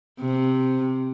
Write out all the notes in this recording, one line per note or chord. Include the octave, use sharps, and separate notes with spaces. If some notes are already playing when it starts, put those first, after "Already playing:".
C3